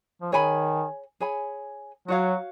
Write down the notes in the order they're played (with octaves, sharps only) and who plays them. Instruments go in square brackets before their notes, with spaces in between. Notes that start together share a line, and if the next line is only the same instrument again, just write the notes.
[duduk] F3
[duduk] D#3 [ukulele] G#4 C#5 G#5 B5
[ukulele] G#4 C#5 G#5 B5
[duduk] F#3 [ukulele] F#4 C#5 F5